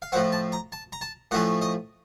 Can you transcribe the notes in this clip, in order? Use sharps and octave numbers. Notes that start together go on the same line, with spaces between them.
F5
A2 F3 C4 F#5
A5
A#5
A5
A#5
A5
A2 F3 A3 C#4 F#5
D#5